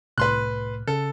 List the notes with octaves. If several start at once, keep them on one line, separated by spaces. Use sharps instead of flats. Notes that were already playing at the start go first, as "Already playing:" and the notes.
C2 A2 B4 C6 F#6
C#3 A4